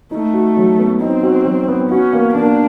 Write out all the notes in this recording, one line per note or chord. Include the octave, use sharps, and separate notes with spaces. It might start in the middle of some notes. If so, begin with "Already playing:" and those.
A3 D#4
F#4
F#3
B3
C4 D#4
F#4
F#3
B3
C#4 F#4
A#3
A#3 D4